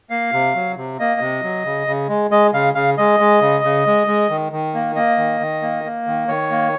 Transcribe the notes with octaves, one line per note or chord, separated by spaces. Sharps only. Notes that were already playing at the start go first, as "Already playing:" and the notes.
A#3 F5
C3
F#3
C3
A#3 D#5
C3
F#3
C#3
C#3
G#3
G#3 D#5
C#3 F5
C#3 F5
G#3 D#5
G#3
C#3
C#3
G#3
G#3
D#3
D#3
A#3
A#3 D#5
D#3
D#3
A#3
A#3
D#3
D#3 C#5
A#3